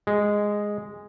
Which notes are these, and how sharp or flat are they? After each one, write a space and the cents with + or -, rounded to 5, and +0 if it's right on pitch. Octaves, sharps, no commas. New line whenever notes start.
G#3 -5